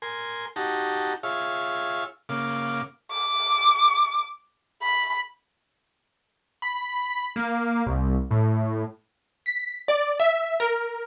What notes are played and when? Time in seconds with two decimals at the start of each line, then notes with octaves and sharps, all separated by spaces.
0.02 A#4 G#5 C6
0.56 D#4 F#4 G4 A5 A#5
1.23 F4 G#4 C#5 E5 F5
2.29 C#3 A#3 F5 D6
3.11 D6
4.82 B5
6.62 B5
7.36 A#3
7.86 C2
8.31 A2
9.46 B6
9.88 D5
10.20 E5
10.60 A#4